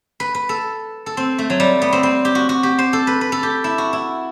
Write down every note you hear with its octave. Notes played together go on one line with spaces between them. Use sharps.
B4
B4
A4
A4
C4
A3
F#3
G3
B3
C4
C4
G4
F#4
F#4
G4
C5
A4
B4
B4
A4
G4
E4
F#4
E4